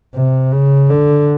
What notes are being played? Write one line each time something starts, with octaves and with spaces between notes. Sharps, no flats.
C3
C#3
D3